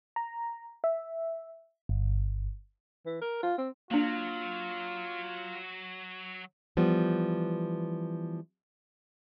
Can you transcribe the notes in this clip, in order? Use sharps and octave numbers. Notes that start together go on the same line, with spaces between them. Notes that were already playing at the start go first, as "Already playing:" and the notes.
A#5
E5
G1
E3
A#4
F4
C4
F#3 A#3 D4 F4
E3 F3 G3 B3